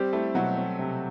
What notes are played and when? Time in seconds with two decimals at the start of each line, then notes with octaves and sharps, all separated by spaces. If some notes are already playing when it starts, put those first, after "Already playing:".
Already playing: G3 C4 G4
0.13 A3 E4 A4
0.35 B2 F#3 F#4
0.57 C4
0.79 C3